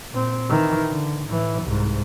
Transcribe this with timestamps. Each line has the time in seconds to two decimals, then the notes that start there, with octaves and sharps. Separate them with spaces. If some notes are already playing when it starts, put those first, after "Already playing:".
0.11 A#2 C4
0.50 D#3 E3
0.89 D3
1.28 A2 E3
1.64 C2 G#2